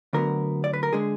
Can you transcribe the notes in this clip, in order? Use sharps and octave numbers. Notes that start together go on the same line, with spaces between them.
D2 D3 F#3 B3 A#4
D5
B4
A#4
D3 G#3 G#4